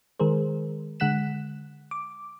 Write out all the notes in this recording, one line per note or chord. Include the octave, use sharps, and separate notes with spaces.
D#3 G#3 G#4 A#4 C5
D3 G#3 F#5 F#6 B6 E7
D6